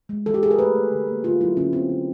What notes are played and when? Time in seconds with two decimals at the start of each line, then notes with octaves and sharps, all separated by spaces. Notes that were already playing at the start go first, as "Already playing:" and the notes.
0.09 G#3
0.26 E3 A4
0.34 G4
0.42 E3 G#4
0.51 A#4
0.59 A3 B4
0.75 A3
0.92 D3
1.08 A#3
1.24 D3 F4
1.41 F#3 E4
1.57 D3 C#4
1.73 B3 C4
1.89 D3